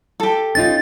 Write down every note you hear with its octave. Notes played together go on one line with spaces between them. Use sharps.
G4 A4
C#4 D#4 F4 A6